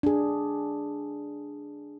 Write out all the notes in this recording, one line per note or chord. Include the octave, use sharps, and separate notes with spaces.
D4 G#4